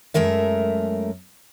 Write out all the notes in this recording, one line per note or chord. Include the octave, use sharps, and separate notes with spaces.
F#2 G#3 A3 A#4 E5